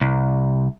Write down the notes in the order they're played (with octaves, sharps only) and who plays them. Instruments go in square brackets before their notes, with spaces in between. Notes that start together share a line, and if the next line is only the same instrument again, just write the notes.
[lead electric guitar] C2